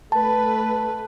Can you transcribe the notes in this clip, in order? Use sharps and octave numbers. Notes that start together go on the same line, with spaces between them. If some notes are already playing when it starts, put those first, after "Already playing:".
A3 B4 A5